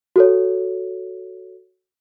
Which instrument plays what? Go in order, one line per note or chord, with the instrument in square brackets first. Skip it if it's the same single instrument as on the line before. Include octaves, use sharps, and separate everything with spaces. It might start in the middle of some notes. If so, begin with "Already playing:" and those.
[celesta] F#4 A4 C#5